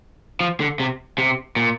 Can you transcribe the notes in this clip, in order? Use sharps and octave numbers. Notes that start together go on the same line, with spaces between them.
F3
D3
C3
C3
A#2